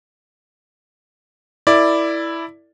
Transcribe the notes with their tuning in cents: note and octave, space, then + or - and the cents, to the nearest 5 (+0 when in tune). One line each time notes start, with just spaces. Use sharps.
E4 +0 A4 +40 D5 +0